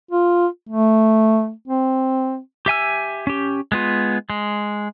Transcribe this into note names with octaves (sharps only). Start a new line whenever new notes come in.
F4
A3
C4
G4 E5 G#5 E6
C#4 G4
G#3 B3 F4
G#3